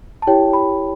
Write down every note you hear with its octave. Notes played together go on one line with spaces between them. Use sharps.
A5
E4 G4 C#5 G5
B5